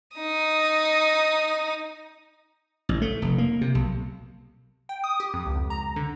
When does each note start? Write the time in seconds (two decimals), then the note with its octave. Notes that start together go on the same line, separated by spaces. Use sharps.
0.17 D#4 D#6
2.89 A1
3.02 A3
3.22 F1
3.38 A#3
3.61 C3
3.75 B1
4.89 G5
5.04 D#6
5.20 G4
5.33 F2
5.46 C#2
5.70 A#5
5.96 D3